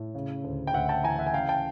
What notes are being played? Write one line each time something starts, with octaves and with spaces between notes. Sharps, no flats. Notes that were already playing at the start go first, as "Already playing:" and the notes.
Already playing: A2
C#3
D2
G5
D2 E5 F#5
G5 A5
E3 G#5 A#5
E5 F#5
G#5
C#3 F5 G5
G5 A5